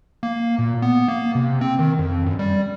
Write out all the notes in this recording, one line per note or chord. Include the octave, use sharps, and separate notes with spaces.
A#3
A#2
B3
A#3
C3
C4
D#3
F2
F#2
G3